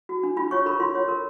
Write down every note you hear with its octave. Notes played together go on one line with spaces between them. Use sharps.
F#4
D4
F4 B5
C#5 C#6
A#4 B5
F4 C6
C#5
A#4